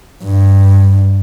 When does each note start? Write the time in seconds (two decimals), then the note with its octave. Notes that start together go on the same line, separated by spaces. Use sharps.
0.23 G2